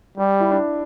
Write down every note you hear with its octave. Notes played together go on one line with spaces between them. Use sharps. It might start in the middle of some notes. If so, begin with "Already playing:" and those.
G3 G4
E4
D4